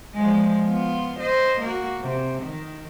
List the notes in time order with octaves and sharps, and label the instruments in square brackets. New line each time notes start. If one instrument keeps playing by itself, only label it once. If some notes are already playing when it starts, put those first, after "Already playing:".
[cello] F3 G#3
B3 F4
C5 D#5
A#3 F#4
C3
D#3